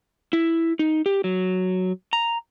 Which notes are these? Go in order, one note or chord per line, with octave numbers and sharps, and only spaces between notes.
E4
D#4
G4
F#3
A#5